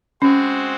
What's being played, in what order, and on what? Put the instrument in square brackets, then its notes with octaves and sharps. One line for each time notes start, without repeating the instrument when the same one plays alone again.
[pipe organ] G#3 C4 F#4 C5 [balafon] C#4